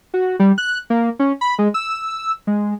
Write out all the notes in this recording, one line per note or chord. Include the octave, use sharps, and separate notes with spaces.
F#4
G3
F#6
A#3
C#4
B5
G#3
E6
G#3